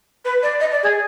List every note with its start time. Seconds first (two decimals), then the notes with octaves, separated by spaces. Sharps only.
0.24 B4
0.42 D5
0.60 D#5
0.71 D5
0.83 G#4